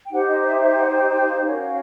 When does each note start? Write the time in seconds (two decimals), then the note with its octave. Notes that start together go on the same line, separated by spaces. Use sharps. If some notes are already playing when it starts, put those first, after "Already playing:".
0.05 G5
0.11 D#4 G4 C5 F#5
0.28 D#5
0.40 D#5
0.45 E5
0.61 E5
0.78 F#5
0.95 G5
1.12 G5
1.29 F5
1.45 C#4 F#4 A#4 C#5